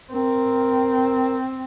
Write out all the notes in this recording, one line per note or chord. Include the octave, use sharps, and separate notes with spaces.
C4 A#4